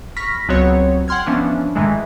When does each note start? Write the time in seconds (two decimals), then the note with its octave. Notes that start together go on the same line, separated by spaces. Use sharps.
0.16 B5 C#6 F6 A#6 B6
0.48 C#2 F#3 B3 C4 F#4 C#5
1.08 F#5 G5 C6 F6 G#6
1.27 E3 F3 B3 C#4 D4
1.75 G#2 D#3 E3 G#3 A3